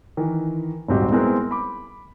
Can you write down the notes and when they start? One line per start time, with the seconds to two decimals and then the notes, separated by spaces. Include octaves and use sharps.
0.17 D#3 E3
0.88 D#1 G#1 C4 F#4 G4 D#5
1.12 G#3 B3 C4 E4 G#4 A#4
1.51 B5 D6